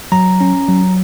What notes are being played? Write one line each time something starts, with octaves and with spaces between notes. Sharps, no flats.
F#3 A#5
C#4
F#3